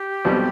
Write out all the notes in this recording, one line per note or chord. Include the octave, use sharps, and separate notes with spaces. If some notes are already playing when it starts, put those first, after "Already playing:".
Already playing: G4
B1 B2 G3 C4